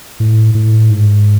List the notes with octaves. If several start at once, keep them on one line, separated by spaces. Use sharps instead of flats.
A2
A2
G#2